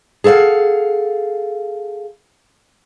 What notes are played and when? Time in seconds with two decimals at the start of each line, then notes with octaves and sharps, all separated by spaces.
0.24 G#4 A4 C5 F5 F#5